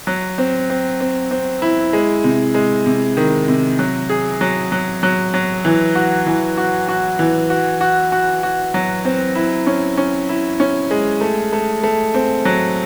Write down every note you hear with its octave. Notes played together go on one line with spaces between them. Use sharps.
F#3
C4
C4
C4
C4
E4
G#3
C3
G#3
C3
D#3
C3
F#3
G#4
F#3
F#3
F#3
F#3
E3
F#4
E3
F#4
F#4
E3
F#4
F#4
F#4
F#4
F#3
C4
E4
C#4
C#4
E4
C#4
G#3
A3
A3
A3
C4
F#3